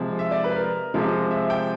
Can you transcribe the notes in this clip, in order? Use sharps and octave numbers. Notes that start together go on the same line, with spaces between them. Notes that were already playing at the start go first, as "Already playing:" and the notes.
Already playing: C3 F3 G#3
E5
D5
B4
A#4
C3 F3 G#3
E5
G5